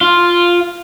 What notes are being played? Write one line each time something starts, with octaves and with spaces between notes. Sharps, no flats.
F4